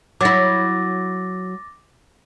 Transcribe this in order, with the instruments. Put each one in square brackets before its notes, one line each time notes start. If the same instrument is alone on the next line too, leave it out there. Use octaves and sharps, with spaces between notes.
[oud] F#3 E4 [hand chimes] D6 A6 A#6